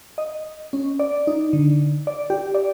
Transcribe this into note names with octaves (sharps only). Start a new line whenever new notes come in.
D#5
C#4
D5
D#4
D3
D5
G4
D5